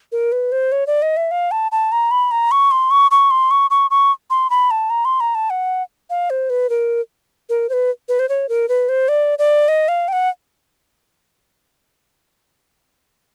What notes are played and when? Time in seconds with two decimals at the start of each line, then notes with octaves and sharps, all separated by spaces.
0.12 A#4
0.32 B4
0.52 C5
0.72 C#5
0.87 D5
1.02 D#5
1.17 E5
1.31 F5
1.51 A5
1.72 A5
1.92 A#5
2.11 B5
2.31 A#5
2.51 C#6
2.71 C6
2.91 C#6
3.11 C#6
3.31 C6
3.51 C#6
3.71 C#6
3.91 C#6
4.30 C6
4.50 B5
4.71 A5
4.90 A#5
5.05 C6
5.20 A#5
5.35 A5
5.50 F#5
6.10 F5
6.30 C5
6.50 B4
6.70 A#4
7.49 A#4
7.69 C5
7.73 B4
8.09 B4
8.19 C5
8.29 C#5
8.49 A#4
8.69 B4
8.89 C5
9.08 D5
9.39 D5
9.68 D#5
9.88 F5
10.08 G5
10.13 F#5